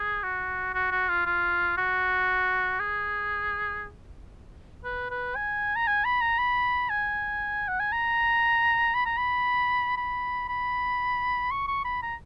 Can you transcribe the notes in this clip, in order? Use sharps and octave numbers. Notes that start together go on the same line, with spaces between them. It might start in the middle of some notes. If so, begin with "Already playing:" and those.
Already playing: G#4
F#4
F#4
F#4
F4
F4
F#4
G#4
B4
B4
G#5
A#5
G#5
B5
A#5
B5
G#5
F#5
G#5
A#5
B5
A#5
B5
B5
B5
C#6
C#6
B5
A#5